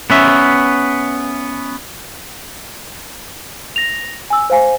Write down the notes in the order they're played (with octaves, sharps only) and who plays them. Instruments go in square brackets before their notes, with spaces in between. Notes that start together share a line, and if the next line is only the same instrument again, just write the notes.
[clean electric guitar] B3 C#4 E5
[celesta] A#6 F7
G#5 E6
C5 F5 G#5